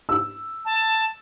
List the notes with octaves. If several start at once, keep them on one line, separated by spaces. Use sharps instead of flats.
E6
A5